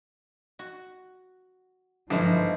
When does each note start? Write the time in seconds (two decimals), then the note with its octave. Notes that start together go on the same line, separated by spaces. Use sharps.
0.59 F#4
2.10 G1 G#2 E3 F3 G#3